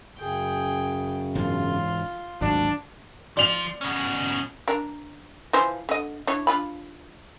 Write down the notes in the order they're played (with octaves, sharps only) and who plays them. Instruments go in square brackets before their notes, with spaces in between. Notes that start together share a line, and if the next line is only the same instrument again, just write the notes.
[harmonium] F#2 C#3 [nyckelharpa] G#4 G5
[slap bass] E1 G#2 [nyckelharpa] F4 C6
[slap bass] G#1 D2 F#3 [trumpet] D4
[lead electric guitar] F3 [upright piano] D5 F7
[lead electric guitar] B2 C#4
[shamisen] D4 A#4
E3 F3 C5
D3 D#5
D4 E4 C#5
D4 F4 B5